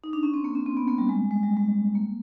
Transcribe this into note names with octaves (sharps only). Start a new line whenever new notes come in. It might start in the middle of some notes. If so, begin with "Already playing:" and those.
D#4
D4
C#4
C4
A#3
C#4
C4
B3
A#3
G3
G#3
G#3
G3
G#3
A#3